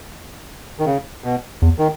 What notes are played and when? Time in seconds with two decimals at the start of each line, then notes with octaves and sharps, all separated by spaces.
0.79 D#3
0.86 C#3
1.24 B2
1.62 E2
1.79 D#3